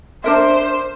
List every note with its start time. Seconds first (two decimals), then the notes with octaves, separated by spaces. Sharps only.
0.24 D4 A#4 C5 E5